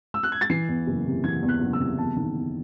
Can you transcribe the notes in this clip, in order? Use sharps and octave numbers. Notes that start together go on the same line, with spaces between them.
E6
F#6
G#6
A6
E3 C7
E2
F#1
C3
E3 G#6
E2
F#6
F#1
E6
C3
E2 A5
D#3
E2